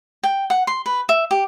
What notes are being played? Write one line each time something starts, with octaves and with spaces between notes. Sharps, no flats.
G5
F#5
C6
B4
E5
G4